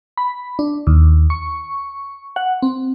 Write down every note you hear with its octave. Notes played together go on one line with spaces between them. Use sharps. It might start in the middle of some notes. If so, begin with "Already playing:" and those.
B5
D4
D#2
C#6
F#5
C4